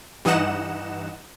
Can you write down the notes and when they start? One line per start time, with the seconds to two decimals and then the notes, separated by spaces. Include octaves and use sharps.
0.25 G2 E3 D#4 D#5 F#5 E7